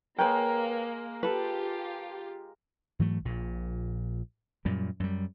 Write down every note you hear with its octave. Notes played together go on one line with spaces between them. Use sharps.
G#3 A#3 A#4 B4 C#5 G5
F4 G4 A4 B4
G#2 E3 F#3 A3
A#1 A#2
F#2 A#2 G3
F#2 G3